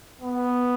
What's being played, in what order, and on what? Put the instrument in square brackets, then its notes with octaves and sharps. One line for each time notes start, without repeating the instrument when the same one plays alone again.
[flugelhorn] B3